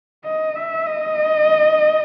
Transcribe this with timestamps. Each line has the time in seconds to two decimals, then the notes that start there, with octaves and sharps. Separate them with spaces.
0.24 D#5
0.55 E5
0.85 D#5